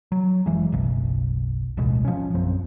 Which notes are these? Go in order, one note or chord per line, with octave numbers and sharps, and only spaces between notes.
F#3
F#1 E3 G#3
F#1 B1
D1 A1 B2 G#3
F3 C#4
A#1 F#2 C4